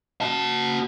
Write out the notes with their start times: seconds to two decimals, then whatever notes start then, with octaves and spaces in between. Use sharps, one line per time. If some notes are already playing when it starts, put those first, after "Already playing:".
0.21 F#4 A5